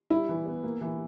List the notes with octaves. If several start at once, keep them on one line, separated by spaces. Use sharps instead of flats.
G3 E4
E3
B3
A#3
E3